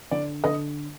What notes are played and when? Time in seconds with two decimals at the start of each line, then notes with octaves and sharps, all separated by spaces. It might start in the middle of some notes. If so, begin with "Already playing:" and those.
0.11 D3 D5
0.44 D3 D#5